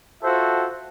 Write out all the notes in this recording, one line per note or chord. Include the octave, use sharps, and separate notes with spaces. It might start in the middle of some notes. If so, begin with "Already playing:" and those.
F4 F#4 A4 C5 E5